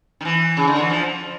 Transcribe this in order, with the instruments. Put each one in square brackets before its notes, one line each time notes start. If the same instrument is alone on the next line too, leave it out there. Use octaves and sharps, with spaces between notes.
[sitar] D#3
E3
C#3
D3
E3
F3